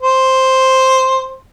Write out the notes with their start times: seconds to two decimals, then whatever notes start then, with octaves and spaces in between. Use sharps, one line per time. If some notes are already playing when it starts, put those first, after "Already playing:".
0.02 C5